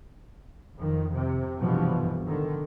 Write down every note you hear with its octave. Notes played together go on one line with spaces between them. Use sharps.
F2 D#3
C3
C2 G2 B2 E3 F3
D3 D#3